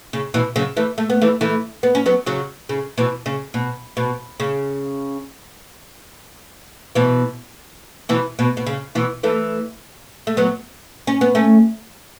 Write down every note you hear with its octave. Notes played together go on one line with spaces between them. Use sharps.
C#3
B2 E3
C#3 F#3
E3 A3
A3
B3
E3 A3
E3 A3
B3
C#4
F#3 B3
C#3 F#3
C#3
B2 E3
C#3
B2
B2
C#3
B2 E3
B2 E3
B2
B2
C#3
B2 E3
E3 A3
A3
F#3 B3
C#4
B3
A3 C#4